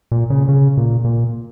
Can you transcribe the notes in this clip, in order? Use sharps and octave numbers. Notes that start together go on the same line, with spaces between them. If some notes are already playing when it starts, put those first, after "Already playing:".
A#2
C#3
C#3
A#2
A#2